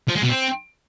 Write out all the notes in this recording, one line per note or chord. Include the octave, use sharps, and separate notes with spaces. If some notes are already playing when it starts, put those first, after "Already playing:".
F3
G#3
B2
C4